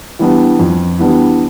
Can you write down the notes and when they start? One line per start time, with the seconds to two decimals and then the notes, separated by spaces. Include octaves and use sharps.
0.19 E3 G3 B3 D4
0.59 F2
0.99 E3 G3 B3 D4